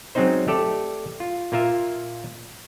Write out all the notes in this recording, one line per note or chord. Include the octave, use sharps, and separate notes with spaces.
F#3 G#3 C4 C#4 D#4 C5
A3 G4 A4 D5
F4
A#2 A#3 F4 A#4 E5